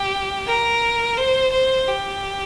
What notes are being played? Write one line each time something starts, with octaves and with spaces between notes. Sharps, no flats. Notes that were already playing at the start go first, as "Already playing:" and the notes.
Already playing: G4
A#4
C5
C5
G4